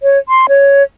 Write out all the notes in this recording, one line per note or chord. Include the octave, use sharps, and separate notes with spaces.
C#5
C6
C#5